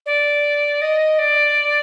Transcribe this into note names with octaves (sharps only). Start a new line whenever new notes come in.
D5
D#5
D5